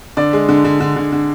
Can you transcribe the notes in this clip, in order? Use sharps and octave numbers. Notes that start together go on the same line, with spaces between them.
D3 D5
G#3
D3
D3
D3
D3
D3